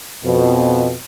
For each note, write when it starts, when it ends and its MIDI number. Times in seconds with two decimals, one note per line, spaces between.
0.24 0.94 41
0.24 0.94 47